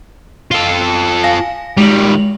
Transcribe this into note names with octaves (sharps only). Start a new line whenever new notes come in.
F4 A4
F5 G#5 A#6
D#3 G3 G#3 F7 F#7